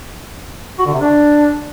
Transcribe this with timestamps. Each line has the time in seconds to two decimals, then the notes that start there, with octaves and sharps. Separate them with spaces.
0.79 F#4
0.86 D3
0.93 C3
1.00 D4